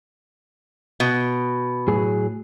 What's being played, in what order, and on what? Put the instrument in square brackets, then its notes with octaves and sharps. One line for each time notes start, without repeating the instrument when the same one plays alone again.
[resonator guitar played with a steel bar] B2
[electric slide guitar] A2 F#3 G#4